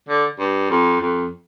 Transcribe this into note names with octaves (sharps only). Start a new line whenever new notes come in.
D3
G2
F2
F2